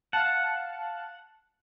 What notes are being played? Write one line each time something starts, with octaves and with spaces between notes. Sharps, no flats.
F5 F#5 A5